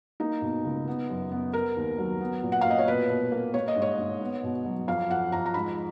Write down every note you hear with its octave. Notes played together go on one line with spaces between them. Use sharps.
A#3 D#4
B2
C#2
B3
F#2
B3
B3 A#4
D#2
F#3
B3
A#2
F#5
A#2 F5
D#5
C#5
B2 B4
B2
A#3
A#3 C#5
D#5
G#2
C#5
G#2
B3
B2
F#3
F2 F5
F2 F#5
F2 A#5
A#5
G#2 B5